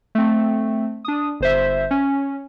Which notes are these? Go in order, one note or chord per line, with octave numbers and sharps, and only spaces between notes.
A3 C4
D4 D#6
G1 C5 E5
C#4